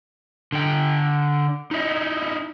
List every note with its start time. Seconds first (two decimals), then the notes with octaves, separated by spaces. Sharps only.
0.52 D3 G5
1.71 D#4 E4 D#5 E5